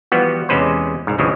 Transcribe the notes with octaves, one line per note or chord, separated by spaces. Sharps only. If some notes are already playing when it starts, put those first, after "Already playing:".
E3 F3 G3 B3 F#4
E2 C3 G#3 C#4 B4 C5
C2 G#2
D2 G2 C#3 E3 F3 G#3